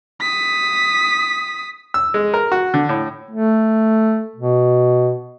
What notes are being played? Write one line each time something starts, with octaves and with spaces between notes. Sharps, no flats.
D#6 B6
E6
G#3
A#4
F#4
D3
A2
A3
B2